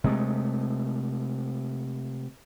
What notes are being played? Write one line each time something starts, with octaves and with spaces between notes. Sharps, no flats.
C3 G#3 A3